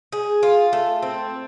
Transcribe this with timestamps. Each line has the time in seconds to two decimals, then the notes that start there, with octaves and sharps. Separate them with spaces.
0.12 G#4
0.43 F4
0.73 A3
1.03 C4